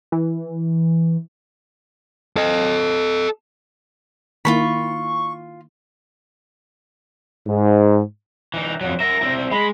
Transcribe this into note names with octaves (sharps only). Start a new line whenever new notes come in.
E3
A4 D#5
D#3 A#3 E4 F4 A4 B5 C#6
G#2
E3 D#4
F2 F#3
A#4 E5 A#6
C4 E4
G#3 B5